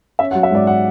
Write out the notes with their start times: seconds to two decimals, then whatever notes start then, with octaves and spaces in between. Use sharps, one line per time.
0.19 C#4 E5
0.31 F#5
0.35 F#3
0.43 E5
0.51 G#2 D5
0.67 F#5